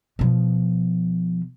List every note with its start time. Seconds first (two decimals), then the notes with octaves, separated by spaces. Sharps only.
0.19 B2 F3